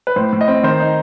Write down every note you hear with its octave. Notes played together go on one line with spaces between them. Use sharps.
B4
A2 C5
A2
D#5
C4
D#3 C5
D#4